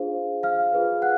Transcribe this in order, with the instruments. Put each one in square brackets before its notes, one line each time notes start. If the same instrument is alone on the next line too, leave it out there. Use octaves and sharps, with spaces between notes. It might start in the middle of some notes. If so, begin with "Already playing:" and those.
Already playing: [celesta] D4 F4 G#4 C5 F5
F5 F6
F4 G#4 B4
F#5 F#6